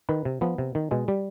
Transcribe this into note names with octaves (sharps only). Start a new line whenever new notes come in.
D#3 B4
C3
F3 B3
C3
D#3
B2 G#3
G3